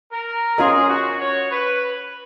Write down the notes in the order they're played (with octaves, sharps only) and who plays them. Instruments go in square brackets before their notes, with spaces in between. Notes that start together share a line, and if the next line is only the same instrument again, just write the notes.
[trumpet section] A#4
[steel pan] C#4 F4 A#4 D#5 [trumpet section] G#4
[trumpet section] F#4
C#5
B4